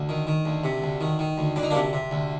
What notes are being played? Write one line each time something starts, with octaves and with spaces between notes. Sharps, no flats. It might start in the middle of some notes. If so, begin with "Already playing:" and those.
Already playing: D2
D#3
D#3
D2
C3
D2
D#3
D#3
D2
D2 D4
D#4
A#3 D4
C3
C3
D2